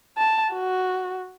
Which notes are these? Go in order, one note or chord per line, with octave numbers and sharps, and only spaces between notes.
A5
F#4